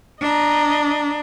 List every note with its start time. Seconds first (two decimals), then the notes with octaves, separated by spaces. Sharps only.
0.21 D4 D#5 A#5